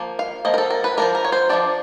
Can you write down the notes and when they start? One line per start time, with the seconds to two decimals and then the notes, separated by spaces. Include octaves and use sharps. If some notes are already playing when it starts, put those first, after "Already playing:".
Already playing: F3 A#3
0.19 F5
0.45 F3 A#3 D#5
0.54 A#4
0.58 A4
0.71 A#4
0.84 B4
0.97 F3 A#3 D4 A#4
1.15 A#4
1.25 C#5
1.32 C5
1.49 F3 A#3 D4 D5